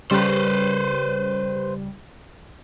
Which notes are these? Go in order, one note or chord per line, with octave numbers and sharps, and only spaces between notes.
C#3 G3 B4 C5